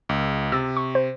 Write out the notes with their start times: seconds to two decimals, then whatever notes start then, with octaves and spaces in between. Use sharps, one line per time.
0.09 C#2
0.52 C3 E6 A6
0.77 C#6
0.95 C5